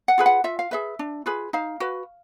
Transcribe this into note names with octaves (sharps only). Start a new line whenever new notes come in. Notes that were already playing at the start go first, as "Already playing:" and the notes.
F#5
F4 G#4 B4
F#5
F4 E5
F5
G#4 B4 E5
D4
F4 G#4 B4
D#4 F5
F#4 B4